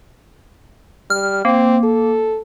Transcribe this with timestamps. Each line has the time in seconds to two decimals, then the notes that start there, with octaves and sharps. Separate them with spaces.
1.10 G3 F6
1.45 A#3 C4
1.84 A4